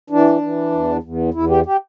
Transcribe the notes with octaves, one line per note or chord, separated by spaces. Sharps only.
E3 D4
E3
E2
E2
E2 E4
G4
G4